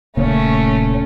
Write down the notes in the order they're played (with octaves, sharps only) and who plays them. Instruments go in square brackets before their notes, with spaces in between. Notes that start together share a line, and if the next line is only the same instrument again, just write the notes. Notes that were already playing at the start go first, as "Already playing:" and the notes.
[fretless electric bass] D#1 C#3 A#3 [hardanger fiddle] A3 C#4